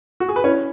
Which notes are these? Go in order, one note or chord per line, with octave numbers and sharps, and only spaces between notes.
F#4
G#4
B4
C#4 E4 C#5